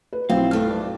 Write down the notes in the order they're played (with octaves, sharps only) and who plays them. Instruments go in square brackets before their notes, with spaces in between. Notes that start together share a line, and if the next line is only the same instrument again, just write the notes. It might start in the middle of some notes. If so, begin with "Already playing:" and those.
[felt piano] B4
[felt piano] B1 E4 [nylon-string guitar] C4 [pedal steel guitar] F5
[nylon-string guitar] G2 A3 [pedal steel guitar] F6
[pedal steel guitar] D5